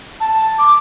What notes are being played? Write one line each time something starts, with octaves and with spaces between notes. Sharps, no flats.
A5
D6